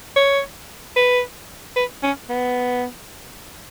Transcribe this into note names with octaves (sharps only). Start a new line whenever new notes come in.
C#5
B4
B4
C#4
B3